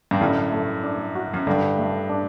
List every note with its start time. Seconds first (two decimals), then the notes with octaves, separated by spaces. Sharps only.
0.11 G2
0.21 F#2 A2 D3
0.52 A3
0.84 D4
1.15 F#4
1.34 F#2
1.47 G2 D3
1.79 A3
2.10 D4